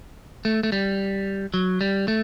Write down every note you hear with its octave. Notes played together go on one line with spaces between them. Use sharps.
A3
A3
G3
F#3
G3
A3